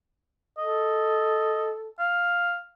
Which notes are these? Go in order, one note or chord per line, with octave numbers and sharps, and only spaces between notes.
A4 D#5
F5